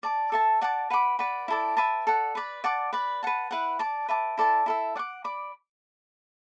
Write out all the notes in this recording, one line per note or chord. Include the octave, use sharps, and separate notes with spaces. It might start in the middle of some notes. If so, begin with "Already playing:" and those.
D5 A5 D6
A4 E5 A5
D5 F#5 A5 D6
B4 F#5 B5 D6
B4 D5 F#5 B5
E4 A4 D5 A5
B4 E5 A5 D6
A4 D5 F#5
B4 D5 B5
D5 F#5 A5 D6
B4 D5 B5
B4 F#5 A5
E4 B4 F#5
D5 A5 D6
B4 E5 A5 D6
E4 A4 D5 A5
E4 A4 E5
D5 F#5 D6
D5 B5 D6